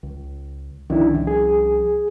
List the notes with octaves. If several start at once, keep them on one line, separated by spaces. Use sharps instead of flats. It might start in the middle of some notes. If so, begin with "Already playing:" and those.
C#2
C2 D#3 F3 C#4 D4 E4
G#4